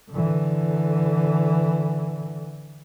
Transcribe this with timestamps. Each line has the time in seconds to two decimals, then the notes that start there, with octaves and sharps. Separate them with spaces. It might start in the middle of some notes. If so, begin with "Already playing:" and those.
0.11 D3 E3